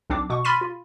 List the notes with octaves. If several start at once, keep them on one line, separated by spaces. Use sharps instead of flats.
B1 C4 D4 D6
B2 C#6
B5 C6 F6 A6 B6 D#7
F4